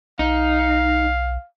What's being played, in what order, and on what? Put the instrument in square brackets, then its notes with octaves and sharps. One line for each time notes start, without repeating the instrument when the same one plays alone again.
[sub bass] B1 [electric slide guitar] D#4 [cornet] F5